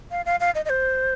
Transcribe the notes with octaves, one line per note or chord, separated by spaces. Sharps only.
F5
F5
F5
D#5
D#5
C5